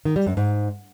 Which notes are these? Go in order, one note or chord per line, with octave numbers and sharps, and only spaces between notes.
D#3
G3
F#2
G#2